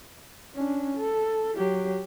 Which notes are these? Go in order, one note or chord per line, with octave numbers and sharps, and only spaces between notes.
C#4 D4
A4
F#3 G4